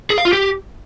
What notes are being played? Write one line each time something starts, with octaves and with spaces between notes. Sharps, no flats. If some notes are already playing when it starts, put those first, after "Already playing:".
G#4
F5
F4
G4